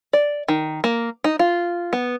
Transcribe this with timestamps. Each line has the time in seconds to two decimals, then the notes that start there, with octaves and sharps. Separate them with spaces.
0.13 D5
0.48 D#3
0.84 A#3
1.24 D#4
1.39 F4
1.93 B3